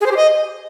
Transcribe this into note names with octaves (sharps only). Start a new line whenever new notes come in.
G#4
C5
G4
D#5